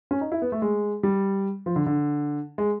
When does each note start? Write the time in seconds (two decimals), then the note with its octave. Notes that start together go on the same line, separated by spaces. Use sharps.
0.11 C#4
0.21 D#4
0.32 E4
0.42 B3
0.52 A3
0.62 G#3
1.03 G3
1.66 F3
1.76 D3
1.86 D3
2.58 G#3